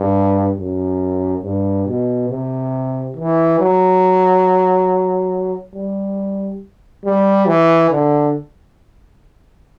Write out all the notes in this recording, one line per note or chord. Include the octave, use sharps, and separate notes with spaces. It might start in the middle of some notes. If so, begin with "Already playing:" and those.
Already playing: G2
F#2
G2
B2
C3
E3
F#3
G3
G3
E3
D3